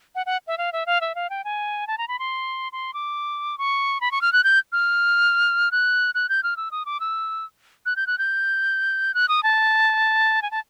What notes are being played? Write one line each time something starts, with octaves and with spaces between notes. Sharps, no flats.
F#5
F#5
E5
F5
E5
F5
E5
F5
G5
G#5
A5
A#5
B5
C6
C6
D6
C#6
B5
C#6
F6
F#6
G6
F6
F#6
F#6
G6
F6
E6
D#6
D6
E6
F#6
G6
F#6
G6
F#6
D#6
A5
G#5
A5